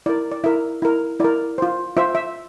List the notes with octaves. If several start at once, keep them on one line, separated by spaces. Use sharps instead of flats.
E4 A#4 D5
D5
E4 A#4 E5
E4 A#4
E4 A#4 D5
F4 C5
F4 C5 E5
E5